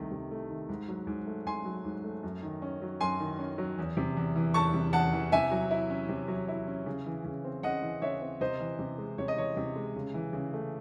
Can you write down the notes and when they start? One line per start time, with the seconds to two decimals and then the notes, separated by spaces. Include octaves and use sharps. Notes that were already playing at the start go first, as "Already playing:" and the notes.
Already playing: C2 C3 D#3 A3
0.11 C3
0.31 A3
0.49 D#3
0.69 G#2
0.88 F#3
1.07 G#2
1.27 A3
1.46 G#2 G#5 C6
1.65 F#3
1.84 G#2
2.04 A3
2.23 F#2
2.43 D#3
2.62 C#4
2.82 F#3
3.01 F#2 G#5 C6
3.19 D#3
3.39 C#4
3.58 F#3
3.78 E2
3.97 C3
4.17 E2
4.36 E3
4.54 E2 A5 C#6
4.74 C3
4.93 E2 F#5 A5
5.13 E3
5.32 C3 E5 G#5
5.51 F#3
5.71 E4
5.90 C#4
6.09 C3
6.28 F#3
6.48 E4
6.67 C#4
6.86 C#3
7.06 E3
7.24 C#3
7.44 C4
7.63 C#3 D#5 F#5
7.82 E3
8.02 C#3 C#5 E5
8.21 C4
8.41 C3 C5 D#5
8.60 E3
8.79 C3
8.98 G#3
9.18 C3 C#5
9.28 D#5
9.36 E3 C#5
9.57 C3
9.76 G#3
9.95 C#3
10.14 E3
10.33 C#3
10.53 A3